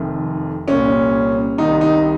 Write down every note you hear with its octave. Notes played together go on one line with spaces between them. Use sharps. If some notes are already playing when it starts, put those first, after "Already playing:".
Already playing: F1 F2 D#3
C2 A#2 C#4
C2 C3 D#3 D#4
D#4